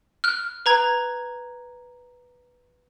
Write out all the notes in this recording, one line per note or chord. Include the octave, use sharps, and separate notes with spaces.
F6 F#6
B4 A#5 G#6